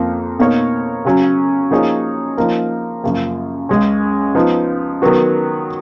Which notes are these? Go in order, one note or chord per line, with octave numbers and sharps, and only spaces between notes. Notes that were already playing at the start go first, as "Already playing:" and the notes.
Already playing: F2 F3 A#3
B2 A#3 D#4 A#4 C#5
C#3 F#3 C#4
F3 A#3 D#4 G#4 C#5
F3 A#3 D#4 A#4
F#2 C#3 F3 A#3 F4
C#2 C#3 G#3 C#4
F3 B3 D#4
D#3 F#3 B3 F#4